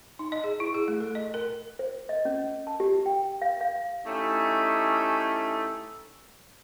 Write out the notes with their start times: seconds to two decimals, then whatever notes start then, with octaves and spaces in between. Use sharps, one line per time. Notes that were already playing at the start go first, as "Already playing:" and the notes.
0.19 D#4
0.32 D#5
0.44 G#4
0.60 E4
0.74 G#4
0.88 A3
1.00 A4
1.15 D#5
1.34 A#4
1.79 C5
2.09 D#5
2.25 C#4
2.67 A5
2.80 G4
3.06 G5
3.42 F5
3.61 F5
4.06 A3 C#4 D#4 E4 G4